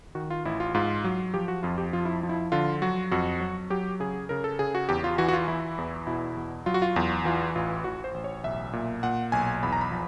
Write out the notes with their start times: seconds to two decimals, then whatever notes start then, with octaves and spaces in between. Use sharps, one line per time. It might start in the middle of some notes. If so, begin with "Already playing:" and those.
0.15 D#3 F#4
0.30 F4
0.45 A1 E4
0.60 F4
0.74 G#2 F4
1.04 F#3
1.34 F3 G4
1.48 F#4
1.63 F2 F4
1.78 G4
1.93 F3 F4
2.05 E4
2.23 F3
2.29 E4
2.52 D3 F4
2.82 F#3 F#4
3.11 F2 F#4
3.40 F#3
3.70 F#3 G4
4.00 C#3 G#4
4.29 C#3 A#4
4.44 A4
4.59 C#3 G#4
4.75 F#4
4.89 E2 G4
5.04 F4
5.18 E3 F#4
5.28 F#4
5.33 F4
5.48 E3 E4
5.78 E2
6.07 B2 E4
6.37 E2
6.66 F#3 F4
6.74 F#4
6.82 F4
6.96 E2
7.25 E3 F4
7.55 A1 F4
7.84 A1 F#4
8.04 C5
8.14 A1
8.24 C#5
8.44 B1 E5
8.73 A#2
9.03 A#2 F#5
9.32 B1 G#5
9.63 E2 B5
9.72 A#5
9.81 B5
9.91 F3